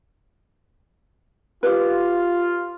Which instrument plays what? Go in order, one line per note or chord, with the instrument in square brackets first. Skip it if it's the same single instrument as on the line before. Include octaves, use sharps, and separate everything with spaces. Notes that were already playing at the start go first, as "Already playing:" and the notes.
[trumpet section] F4 [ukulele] G4 B4